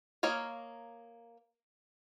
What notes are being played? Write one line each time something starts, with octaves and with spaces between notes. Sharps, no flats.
A#3 C#5 D#5 F5